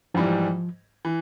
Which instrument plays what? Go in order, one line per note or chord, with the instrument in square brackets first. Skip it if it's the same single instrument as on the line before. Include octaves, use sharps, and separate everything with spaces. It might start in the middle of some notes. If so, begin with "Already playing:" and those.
[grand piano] G#2 E3 G3 [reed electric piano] F3
[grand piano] E3